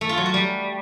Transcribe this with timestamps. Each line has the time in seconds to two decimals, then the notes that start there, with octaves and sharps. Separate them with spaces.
0.01 A3
0.09 F4
0.17 F#3
0.26 F#4
0.34 G3